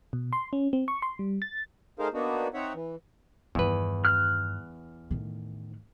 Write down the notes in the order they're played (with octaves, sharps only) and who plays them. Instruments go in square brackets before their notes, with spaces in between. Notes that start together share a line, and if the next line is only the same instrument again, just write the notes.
[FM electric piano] B2
C6
C#4
C4
C#6
C6
G3
A6
[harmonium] A3 D#4 G#4 A#4 C5 F5
A#3 B3 D4 D#4 F#4
C4 D#4 C#5 E5 F#5
E3
[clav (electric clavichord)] E2 B4 [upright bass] G2 D#3
[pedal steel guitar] F6 F#6
[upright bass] A2 D#3